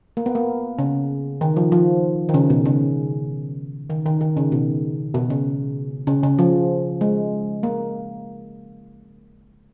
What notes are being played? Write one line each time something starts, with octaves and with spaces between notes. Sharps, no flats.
A#3
B3
A#3
C#3
D#3
F3
F3
D#3
C#3
B2
C#3
D#3
D#3
D#3
C#3
B2
B2
C#3
C#3
C#3
F3
G#3
A#3